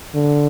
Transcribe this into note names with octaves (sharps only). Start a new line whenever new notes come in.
D3